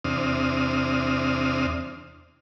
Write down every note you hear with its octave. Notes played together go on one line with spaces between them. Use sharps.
E2 C3 C4 D4 D#6 F6